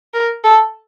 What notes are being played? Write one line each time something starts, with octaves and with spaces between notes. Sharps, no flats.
A#4
A4